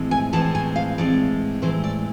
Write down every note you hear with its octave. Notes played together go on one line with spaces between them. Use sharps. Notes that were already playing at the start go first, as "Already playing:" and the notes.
Already playing: A2 E3 G#3 C4
G#5
A2 E3 G#3 C4 A5
G#5
F5
A2 E3 G#3 C4 D5
A2 E3 G#3 C4 C5
D5